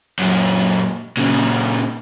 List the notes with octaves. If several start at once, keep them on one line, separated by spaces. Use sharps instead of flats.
F#2 A#2
A#2 C#3